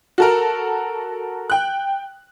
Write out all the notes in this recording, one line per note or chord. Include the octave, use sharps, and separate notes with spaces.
F#4 A4 A#4
G5 F#6